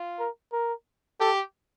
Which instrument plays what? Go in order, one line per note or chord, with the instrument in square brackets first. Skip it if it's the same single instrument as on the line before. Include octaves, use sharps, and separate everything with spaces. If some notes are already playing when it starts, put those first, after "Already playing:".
Already playing: [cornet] F4
[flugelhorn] A#4
A#4
[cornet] G4 [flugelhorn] A4